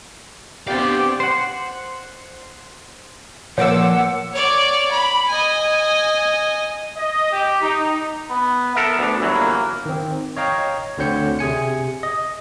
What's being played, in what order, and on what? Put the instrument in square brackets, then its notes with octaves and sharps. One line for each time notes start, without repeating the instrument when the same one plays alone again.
[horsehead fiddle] B3 C4 [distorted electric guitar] D4 F5 [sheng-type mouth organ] G4 G5 [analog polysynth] D5
[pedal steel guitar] C5 F#5
[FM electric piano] A#2 D6 E6 [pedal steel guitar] F3 [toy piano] A#4 C#5 [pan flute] F#5
[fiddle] C#5 D5
B5
D#5 G#5
[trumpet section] D#5
G4
D#4
[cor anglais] B3
[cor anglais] B3 [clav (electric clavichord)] A4 A#4 E5
[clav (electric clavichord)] D2 D4
G1 E3 F#3
[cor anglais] A#3
[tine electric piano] D#3 C4
C#5 D#5 F5 G5 A#5
D2 D3 C4 C#5 G6 C#7
C3 G#4 G#5 C#7
D#5